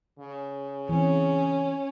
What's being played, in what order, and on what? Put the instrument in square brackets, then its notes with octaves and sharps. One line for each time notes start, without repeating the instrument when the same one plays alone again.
[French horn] C#3
[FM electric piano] E3 C4 [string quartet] C#4